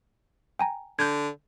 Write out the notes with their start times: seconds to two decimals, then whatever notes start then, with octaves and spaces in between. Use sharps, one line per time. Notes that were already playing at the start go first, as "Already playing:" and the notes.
0.59 G5 G#5 A#5
0.99 D3 G6 G#6